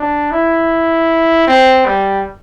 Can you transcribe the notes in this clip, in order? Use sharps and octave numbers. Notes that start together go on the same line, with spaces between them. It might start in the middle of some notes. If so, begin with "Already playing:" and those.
Already playing: D4
E4
C4
G3